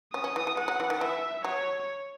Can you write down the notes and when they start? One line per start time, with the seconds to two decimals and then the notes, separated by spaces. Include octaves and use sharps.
0.14 C#4 D#6
0.24 C#4
0.36 E3
0.47 E3
0.57 G#3 F#5
0.68 F#3
0.80 E3
0.90 D#3
1.01 E3 E5
1.44 F#3 C#5